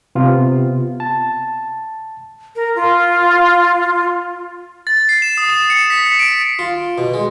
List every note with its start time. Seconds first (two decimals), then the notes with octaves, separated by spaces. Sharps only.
0.15 C3 B3 F4
1.00 A5
2.56 A#4
2.76 F4
4.87 A6
5.09 C7
5.22 E7
5.38 D#6
5.50 E7
5.70 C#7
5.90 B6
6.19 D7
6.59 F4
6.98 B2
7.14 G#3